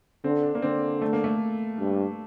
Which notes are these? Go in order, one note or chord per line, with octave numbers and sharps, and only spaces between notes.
D3 C4
D4
A#3
D3 C4
A3
A#3
A3
G2